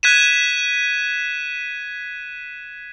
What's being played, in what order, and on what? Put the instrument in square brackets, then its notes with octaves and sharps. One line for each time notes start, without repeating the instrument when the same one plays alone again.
[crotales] F#6 G#6 B6 D#7 E7